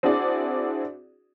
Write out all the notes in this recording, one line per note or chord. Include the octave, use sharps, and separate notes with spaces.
C4 D4 E4 F#4 G#4 D5